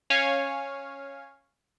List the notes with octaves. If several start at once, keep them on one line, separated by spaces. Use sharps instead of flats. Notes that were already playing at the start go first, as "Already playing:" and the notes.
C#4 C#5 F5 G#5